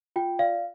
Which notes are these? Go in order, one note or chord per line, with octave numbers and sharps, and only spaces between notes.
F4 G5
D5 F5